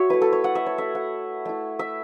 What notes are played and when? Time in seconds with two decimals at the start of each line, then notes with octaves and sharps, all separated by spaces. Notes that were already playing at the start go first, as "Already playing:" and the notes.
Already playing: F#4 C#5 E5
0.10 A3 E4 B4
0.22 A4
0.33 C#5
0.44 F#5
0.55 E5
0.66 C#5
0.78 A3 E4 E5
0.95 F#5
1.45 A3 E4
1.79 E5